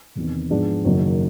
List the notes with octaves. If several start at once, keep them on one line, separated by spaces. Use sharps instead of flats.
E1 E2 C3 D#3
G#2 F3 G#3 B3 D4
F#1 F#2 D#3 F#3